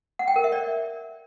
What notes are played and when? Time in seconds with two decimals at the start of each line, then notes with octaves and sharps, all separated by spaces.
0.19 F#5
0.28 G5
0.36 A#4
0.44 E5
0.52 D5